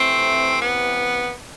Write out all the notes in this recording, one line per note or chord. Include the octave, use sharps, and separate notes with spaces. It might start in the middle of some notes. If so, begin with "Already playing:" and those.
Already playing: C3 E3 A3 C4
B3